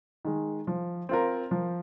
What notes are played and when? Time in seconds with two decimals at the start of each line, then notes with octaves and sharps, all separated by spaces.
0.25 D#3 G#3
0.67 F3
1.09 C4 F4 A#4
1.51 F3